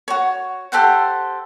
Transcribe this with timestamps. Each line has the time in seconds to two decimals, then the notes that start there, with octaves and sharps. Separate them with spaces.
0.08 F#4 C#5
0.72 G4 A4 C5 F#5